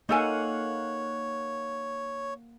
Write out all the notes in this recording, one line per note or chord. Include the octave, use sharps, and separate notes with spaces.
A#3 D#4 A4 C#5 F5 F#5 G#5